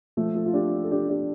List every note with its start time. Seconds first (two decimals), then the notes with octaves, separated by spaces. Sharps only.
0.17 F3 A3
0.35 F4 A4
0.46 F4
0.53 D4 G4
0.84 A4
0.91 D4 G4
1.09 D4 G4